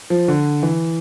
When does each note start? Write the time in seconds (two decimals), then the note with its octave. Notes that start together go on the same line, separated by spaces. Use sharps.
0.10 F3
0.28 D3
0.63 E3